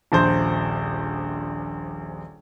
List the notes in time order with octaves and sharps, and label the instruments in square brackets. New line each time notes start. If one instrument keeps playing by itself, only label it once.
[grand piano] D#1 A#1 C5